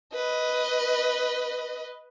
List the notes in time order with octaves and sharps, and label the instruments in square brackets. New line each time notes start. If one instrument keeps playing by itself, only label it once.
[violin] B4 D#5